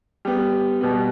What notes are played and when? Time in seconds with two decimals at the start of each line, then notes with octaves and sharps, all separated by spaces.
0.25 G3 B3 G4
0.81 B2 G3 B3